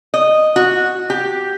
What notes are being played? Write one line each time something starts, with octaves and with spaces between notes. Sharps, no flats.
D#5
F#4
G4